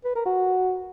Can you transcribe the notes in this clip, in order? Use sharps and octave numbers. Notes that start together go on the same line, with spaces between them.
B4
A#4
F#4